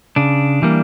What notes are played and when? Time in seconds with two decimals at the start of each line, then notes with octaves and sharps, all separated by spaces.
0.16 C#3 D4
0.62 E3 G3 A#3